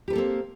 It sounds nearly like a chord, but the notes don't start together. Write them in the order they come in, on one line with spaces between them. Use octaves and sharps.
G4 B4 A4 A#3 C4